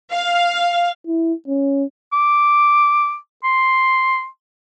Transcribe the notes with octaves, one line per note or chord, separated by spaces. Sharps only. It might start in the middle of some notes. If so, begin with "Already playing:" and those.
F5
E4
C#4
D6
C6